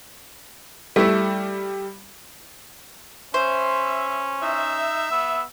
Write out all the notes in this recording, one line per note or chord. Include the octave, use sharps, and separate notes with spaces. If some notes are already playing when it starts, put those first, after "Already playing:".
G3 A3 E4
C#4 C5 E5
D#4 E5
B3 E6